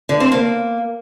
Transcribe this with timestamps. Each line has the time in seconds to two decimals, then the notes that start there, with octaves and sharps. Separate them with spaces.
0.09 D3
0.20 C4
0.32 A#3